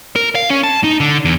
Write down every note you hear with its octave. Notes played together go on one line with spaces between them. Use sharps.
A#4
F5
C#4
A5
D#4
D3
E2